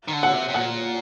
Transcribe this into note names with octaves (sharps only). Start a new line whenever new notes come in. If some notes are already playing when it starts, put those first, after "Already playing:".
D#3
D3
F#5
C3
C3
A#2 F#5